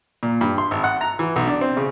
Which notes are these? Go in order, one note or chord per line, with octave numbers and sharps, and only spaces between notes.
A#2
G2
C6
G#1
F#5
A#5
E3
B1
D4
C4
C#3